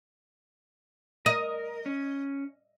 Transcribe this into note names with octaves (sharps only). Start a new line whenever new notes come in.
A#4 D#5
C#4